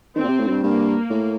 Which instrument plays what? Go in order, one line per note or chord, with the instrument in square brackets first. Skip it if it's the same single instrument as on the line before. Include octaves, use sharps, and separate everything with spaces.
[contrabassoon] D#3 [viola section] C4
[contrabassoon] A#2
C3
A2
F#2
G2
[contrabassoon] G2 [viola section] A#3
[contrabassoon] A2